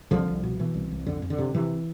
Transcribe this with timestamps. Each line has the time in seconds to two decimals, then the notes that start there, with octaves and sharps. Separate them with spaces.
0.11 C2 D3 F3
0.28 C2
0.43 B2
0.59 B2 E3
0.74 C2
0.91 C2
1.06 F2 D3
1.22 F2
1.30 D3
1.38 C3
1.54 C3 E3